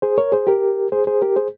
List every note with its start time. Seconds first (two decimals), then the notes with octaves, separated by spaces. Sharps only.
0.02 G#4 C5
0.18 A#4 C#5
0.32 G#4 C5
0.47 G4 A#4
0.92 G#4 C5
1.07 G#4 C5
1.22 G4 A#4
1.36 G#4 C5